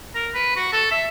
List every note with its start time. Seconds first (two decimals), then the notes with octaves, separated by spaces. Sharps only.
0.14 A#4
0.34 B4
0.56 F#4
0.73 A4
0.91 E5